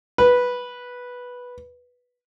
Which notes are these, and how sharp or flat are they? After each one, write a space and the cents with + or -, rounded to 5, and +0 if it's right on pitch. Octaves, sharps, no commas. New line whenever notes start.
B4 -5